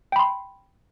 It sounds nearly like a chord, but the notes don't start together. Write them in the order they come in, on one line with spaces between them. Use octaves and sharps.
G5 B5 C6